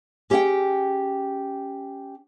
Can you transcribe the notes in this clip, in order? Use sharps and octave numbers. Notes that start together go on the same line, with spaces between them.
C#4 G4 G#4 D5 F#5 G5